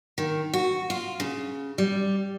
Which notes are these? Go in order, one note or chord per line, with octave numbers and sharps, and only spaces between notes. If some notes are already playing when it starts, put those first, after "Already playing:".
D#3
F#4
F4
C#3
G3